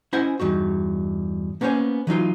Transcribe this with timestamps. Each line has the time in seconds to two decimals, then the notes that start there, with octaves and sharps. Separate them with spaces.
0.13 C#4 E4 C5 D#5 F#5 G#5
0.40 E2 G2 D#4 F#4
1.61 A#3 B3 C#4 C5 C#5 G#5
2.07 E3 F#3 D#4 F4